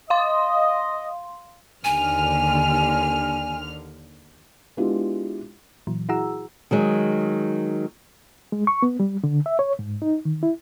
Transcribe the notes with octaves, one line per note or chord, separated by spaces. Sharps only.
D#5 F5 C6
D#2 D3 G#5 F6
G#3 B3 D4 E4 F4 G4
A#2 E3 F#3
E4 F#4 G#4 F#5 A#5 E6
D#3 F#3 G#3
G#3
C#6
B3
G3
D3
E5
C#5
G#2
D#4
D#3
E4